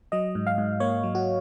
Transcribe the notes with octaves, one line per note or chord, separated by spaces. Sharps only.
F#3 D#5
G#2
F5
G#2
A#3 C#5
F#3
F#4